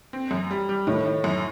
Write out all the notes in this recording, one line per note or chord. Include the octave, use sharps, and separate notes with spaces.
C4
F#2
G3
G3
A2 D#3
D#3
F#2